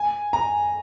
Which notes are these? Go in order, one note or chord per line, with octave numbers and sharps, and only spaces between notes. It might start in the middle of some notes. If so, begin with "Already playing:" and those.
Already playing: G#5
A#5